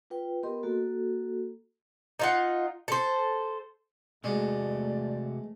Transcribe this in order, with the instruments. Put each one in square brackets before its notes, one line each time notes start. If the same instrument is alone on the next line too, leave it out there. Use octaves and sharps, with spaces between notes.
[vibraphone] F4 B4 G5
B3 G4 A#4 D#5 C6
A#3 F#4 A4
[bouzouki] D#4 F4 F#5
A4 C5
[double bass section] E2 A3 [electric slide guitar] C3 F#4 [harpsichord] G#3 [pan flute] D5